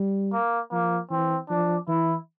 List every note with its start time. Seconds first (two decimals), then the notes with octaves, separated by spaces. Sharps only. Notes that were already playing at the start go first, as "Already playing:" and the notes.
Already playing: G3
0.33 A#3
0.71 F3 A#3
1.10 E3 C4
1.50 F3 D4
1.88 E3 E4